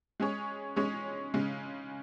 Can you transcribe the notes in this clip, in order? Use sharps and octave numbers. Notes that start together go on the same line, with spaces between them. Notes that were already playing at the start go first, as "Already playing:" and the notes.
G#3 C#4 G#4 C#5
G#3 C#4 G#4 C#5
C#3 G#3 C#4